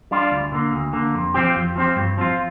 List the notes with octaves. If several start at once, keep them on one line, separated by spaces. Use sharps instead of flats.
G3 D4 F4
D2
D3 A#3
D2
D3 A#3
F2
F3 C4 G4
F2
F3 C4 G4
G2
F3 C4 F4